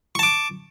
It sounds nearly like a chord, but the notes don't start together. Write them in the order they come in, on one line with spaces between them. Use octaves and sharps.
C#6 A5 D6